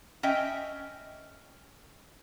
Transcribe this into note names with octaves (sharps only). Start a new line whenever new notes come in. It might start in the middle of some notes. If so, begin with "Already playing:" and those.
C#4 D#5 E5 G5